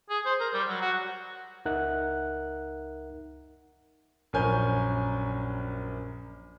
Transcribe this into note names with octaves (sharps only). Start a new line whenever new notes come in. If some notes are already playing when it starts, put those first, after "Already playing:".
G#4
C5
A#4
G3
F#3
F#4
C#2 D#4 A#4 E5 F#5 F#6
A#1 F#2 A#4 C#5 G#5 G6